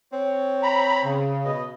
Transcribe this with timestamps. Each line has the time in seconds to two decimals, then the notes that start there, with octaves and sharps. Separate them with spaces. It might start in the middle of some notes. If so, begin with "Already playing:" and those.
0.13 C4 C#5
0.63 A#5 B5
1.04 C#3
1.45 B2 B4 D#5